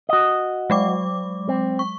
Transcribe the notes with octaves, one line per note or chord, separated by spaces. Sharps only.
F#4 D#5
F#3 G#3 D6
C4
C#6